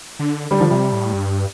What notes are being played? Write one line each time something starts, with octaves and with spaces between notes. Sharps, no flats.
D3
D3 G3
F3
C3 G3
A2
G2